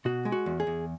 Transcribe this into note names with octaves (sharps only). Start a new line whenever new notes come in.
B2 F#4
G#3
F#4
E2
G#4
E2